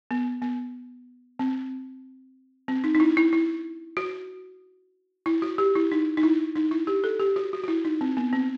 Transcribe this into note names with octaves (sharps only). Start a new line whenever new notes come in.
B3
B3
C4
C4
D#4
D#4
E4
E4
E4
F#4
E4
F#4
G4
E4
D#4
D#4
E4
D#4
E4
G4
A4
G4
F#4
F#4
F#4
E4
D#4
C4
B3
C4